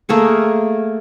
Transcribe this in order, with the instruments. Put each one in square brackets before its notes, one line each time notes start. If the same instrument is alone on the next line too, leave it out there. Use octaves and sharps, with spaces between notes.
[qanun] A3 A#3 G#4 C#6